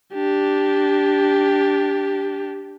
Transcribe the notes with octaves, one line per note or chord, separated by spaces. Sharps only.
D4 G4